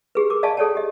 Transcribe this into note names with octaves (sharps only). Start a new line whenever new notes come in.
G4 G#4 B4
A#4 D6
D5 D#5 F5 G#5 A5 C#6
G#4 A4 C#5 D5 G5 A5
G4 D#5